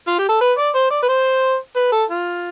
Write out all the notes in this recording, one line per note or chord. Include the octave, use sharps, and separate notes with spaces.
F4
G4
A4
B4
D5
C5
D5
B4
C5
B4
A4
F4